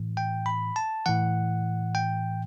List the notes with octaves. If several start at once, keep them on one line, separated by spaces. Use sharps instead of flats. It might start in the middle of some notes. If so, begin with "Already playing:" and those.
Already playing: A2 E3
G5
B5
A5
A2 E3 F#5
G5